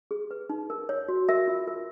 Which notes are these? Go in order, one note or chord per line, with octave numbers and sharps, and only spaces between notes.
G#4
B4
D#4
A#4
C#5
F#4
A#4 E5
F4
A#4